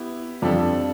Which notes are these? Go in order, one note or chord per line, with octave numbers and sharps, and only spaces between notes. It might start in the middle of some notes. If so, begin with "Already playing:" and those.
Already playing: B3 E4 G4
F2 G3 D4 A4